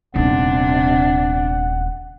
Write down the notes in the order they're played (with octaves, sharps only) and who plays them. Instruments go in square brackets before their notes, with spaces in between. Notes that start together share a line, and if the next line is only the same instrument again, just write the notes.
[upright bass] D#1 B3 [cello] C3 D4 [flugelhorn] F#5